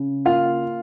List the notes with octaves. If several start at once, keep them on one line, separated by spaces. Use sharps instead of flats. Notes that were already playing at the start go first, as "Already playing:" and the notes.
Already playing: C#3
A#3 F4 F5